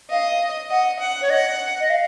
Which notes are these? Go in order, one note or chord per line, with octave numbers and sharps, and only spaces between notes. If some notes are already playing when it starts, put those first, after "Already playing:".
D#5 F5
D#5 F#5
F#5
C#5
D#5 F#5
D#5
F5